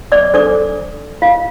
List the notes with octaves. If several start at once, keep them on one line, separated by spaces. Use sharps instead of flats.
D5 D6
D4 A4 C5 D5 D6
F4 F5